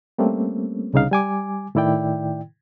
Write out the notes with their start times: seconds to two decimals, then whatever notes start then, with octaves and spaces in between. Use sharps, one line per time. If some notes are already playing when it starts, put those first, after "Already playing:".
0.18 G3 A3 A#3 C4 C#4
0.93 C2 C#3 D#4 F5
1.11 G3 G#5 D6
1.75 A2 D#3 E4 D5 G5